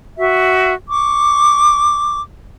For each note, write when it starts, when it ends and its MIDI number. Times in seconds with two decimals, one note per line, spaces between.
0.18 0.74 66
0.18 0.74 76
0.88 2.20 85
0.88 2.20 86